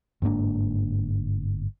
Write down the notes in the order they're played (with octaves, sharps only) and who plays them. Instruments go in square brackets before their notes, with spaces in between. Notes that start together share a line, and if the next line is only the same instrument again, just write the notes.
[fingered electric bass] G1 G#2 A#3 D4